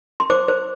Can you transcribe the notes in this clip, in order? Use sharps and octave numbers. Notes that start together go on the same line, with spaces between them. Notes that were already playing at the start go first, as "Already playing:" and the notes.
C6
C5 D6
C5